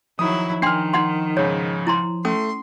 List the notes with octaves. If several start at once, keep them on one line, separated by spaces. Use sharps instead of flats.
D#3 F3 F#3 E4 D#6
D#3 D4 G5 C6 F6 C7
D#4 F#5 C6
G#2 C#3 C#5
E4 A#5 C6
A3 C#4 C6 D#6